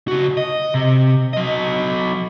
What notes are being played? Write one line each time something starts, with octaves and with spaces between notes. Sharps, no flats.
C#3 F#4
D#5
C3
F#3 D#5